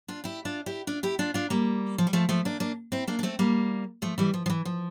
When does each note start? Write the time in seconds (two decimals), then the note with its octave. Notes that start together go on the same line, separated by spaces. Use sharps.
0.08 D4 F4
0.24 E4 G4
0.45 D4 F4
0.66 E4 G4
0.87 D4 F4
1.03 E4 G4
1.19 D4 F4
1.34 D4 F4
1.50 G3 A#3
1.98 F3
2.07 G3
2.13 F3 A3
2.29 F3 A3
2.45 A#3 D4
2.60 A#3 D4
2.92 C4 E4
3.07 A#3 D4
3.19 D4
3.23 A3 C4
3.39 G3 A#3
4.02 F3 A3
4.18 E3 G3
4.34 F3
4.46 F3
4.50 E3
4.65 F3